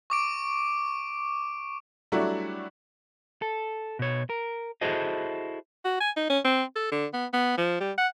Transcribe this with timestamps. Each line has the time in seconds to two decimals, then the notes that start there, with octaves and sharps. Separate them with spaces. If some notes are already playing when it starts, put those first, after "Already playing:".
0.10 C#6 D6 D7
2.12 F#3 G3 A3 D4 E4 F#4
3.42 A4
3.99 B2 C#5
4.30 A#4
4.81 E4 F#4 G#4 A4 C5 D#5
5.85 F#4
6.01 G#5
6.16 D#4
6.30 C#4
6.45 C4
6.76 A4
6.92 D3
7.14 B3
7.34 B3
7.57 F3
7.81 G3
7.98 F#5